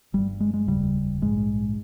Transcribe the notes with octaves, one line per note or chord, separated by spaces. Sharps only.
G1 G2 G3
G#3
G#3
F1 D#2 C#3 G3
A#1 G#2 G#3